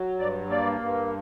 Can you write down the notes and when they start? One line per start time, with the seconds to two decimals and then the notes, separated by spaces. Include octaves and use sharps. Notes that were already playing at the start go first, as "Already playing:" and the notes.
Already playing: F#3
0.19 G2 D5
0.50 A#3 D5
0.81 G2